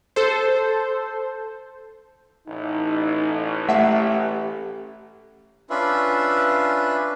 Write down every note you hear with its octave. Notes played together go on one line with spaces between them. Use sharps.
A4 C5
A1 D#4
A3 G4 E5 F#5
C#4 D4 F4 B4 E5